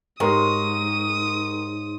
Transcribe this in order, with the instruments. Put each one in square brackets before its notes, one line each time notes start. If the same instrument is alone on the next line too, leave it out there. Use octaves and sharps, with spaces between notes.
[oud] G#2 [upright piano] G4 A#4 [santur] C#5 D#5 C6 [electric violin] D#6